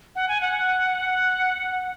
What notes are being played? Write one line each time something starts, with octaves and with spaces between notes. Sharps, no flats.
F#5
G#5
F#5